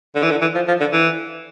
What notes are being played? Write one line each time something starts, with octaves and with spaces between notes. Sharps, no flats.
D3
E3
D3
E3
F3
F3
D3
E3